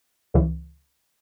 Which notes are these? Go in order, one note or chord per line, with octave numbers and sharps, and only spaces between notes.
C#2 C#3 E3